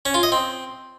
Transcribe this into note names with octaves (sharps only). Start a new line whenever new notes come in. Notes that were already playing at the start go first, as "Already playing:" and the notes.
C#4
F4
D#5
C4